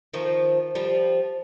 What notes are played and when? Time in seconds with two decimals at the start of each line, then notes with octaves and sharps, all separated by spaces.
0.14 D#3 F3
0.75 F3 G3